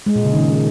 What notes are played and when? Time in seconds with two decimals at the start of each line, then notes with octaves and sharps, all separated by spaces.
0.06 G#3
0.15 A#2
0.24 C#3
0.34 D#3